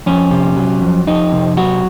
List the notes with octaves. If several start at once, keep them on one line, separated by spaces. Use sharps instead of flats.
F2 C#4
C3
F#3
F2
F2 D#4
C3
F#3 F#4